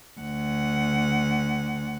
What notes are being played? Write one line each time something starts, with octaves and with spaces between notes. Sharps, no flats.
D2 F#5